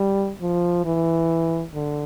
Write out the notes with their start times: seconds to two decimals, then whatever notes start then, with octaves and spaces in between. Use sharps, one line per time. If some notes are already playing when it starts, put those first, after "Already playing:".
Already playing: G3
0.41 F3
0.85 E3
1.74 D3